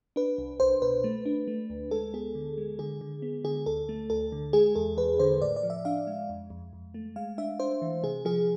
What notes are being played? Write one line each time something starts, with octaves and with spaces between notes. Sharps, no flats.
D4 B4
C2
C2 C5
B2 B4
A3
D4
A3
D2
G#3 A4
B3 G#4
D3
G#3
D3 G#4
D3
B3
D3 G#4
D2 A4
A3
D2 A4
D3
G#3 G#4
E2 A4
E2 B4
D3 C5
A2 D5
D5
F3
E5
D4 F5
G#3
F2
F2
F2
A3
G#3 F5
D4 E5
D4 C5
E3
C3 G#4
F3 G#4